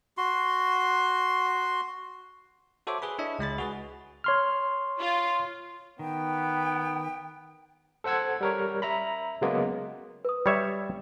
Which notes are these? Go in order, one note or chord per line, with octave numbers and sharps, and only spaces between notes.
F#4 C6
F#4 A4 C5 C#5 E5 D6
G#4 B4 B5
D4 E4 C#5 D#5 E5
C#2 G#3 B5 A6
F#4 G#4 B4
C#5 C6 F6
F4
D#3 B3 G5
A4 C5 F#5 E6 G#6
G3 A#4 C#5
E5 A#5 B5
C#3 F#3 G#3 A#3 B3
B4 D#6
G3 C#5 E5